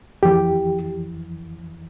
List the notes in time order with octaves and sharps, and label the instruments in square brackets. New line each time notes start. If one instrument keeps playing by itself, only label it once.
[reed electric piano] F2 E3 G4